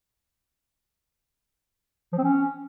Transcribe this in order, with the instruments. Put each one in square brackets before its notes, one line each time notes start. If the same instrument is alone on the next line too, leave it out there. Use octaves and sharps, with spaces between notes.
[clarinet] F3
C4
C#4